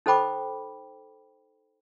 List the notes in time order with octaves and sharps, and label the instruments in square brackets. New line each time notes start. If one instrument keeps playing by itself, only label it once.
[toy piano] D#4 A4 C5 G5 B5 D6